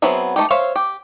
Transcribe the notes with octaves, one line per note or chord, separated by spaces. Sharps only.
F#3 B3 C4 G#4 E5
A3 D#4 G4
C5 C#5 E5 F5
G4